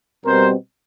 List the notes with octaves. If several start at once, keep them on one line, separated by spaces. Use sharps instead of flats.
B2 G3 C4 A#4 C5